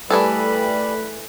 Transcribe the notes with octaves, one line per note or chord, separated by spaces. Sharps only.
E3 G3 A3 G#4 A4 B4